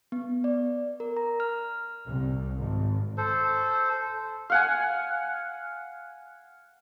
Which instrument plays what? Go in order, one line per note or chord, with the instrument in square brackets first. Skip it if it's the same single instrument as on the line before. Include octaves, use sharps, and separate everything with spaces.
[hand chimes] B3
D5
A#4
A#5
F6
[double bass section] C2
G#1
[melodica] A4 C5
[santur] F5 F#5 G#5